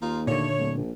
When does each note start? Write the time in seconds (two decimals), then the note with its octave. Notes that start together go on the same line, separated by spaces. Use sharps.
0.02 D#2 D#4 F4
0.27 A#2 D3 A3 C#5
0.59 D1
0.77 A#1